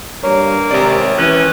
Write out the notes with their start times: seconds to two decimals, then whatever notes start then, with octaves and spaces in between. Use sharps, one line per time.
0.23 G2 A#3 C#5
0.71 G#1 C3 D5
1.18 E3 C#4 F#6